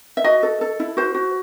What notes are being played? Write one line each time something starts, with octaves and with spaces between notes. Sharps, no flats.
E5
F#4 D#5
A4
A4
E4
F#4 C5
F#4